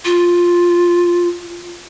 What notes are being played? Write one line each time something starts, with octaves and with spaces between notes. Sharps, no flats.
F4